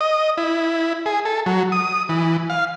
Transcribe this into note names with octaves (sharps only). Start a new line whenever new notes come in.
D#5
E4
G#4
A4
F#3
D#6
E3
F5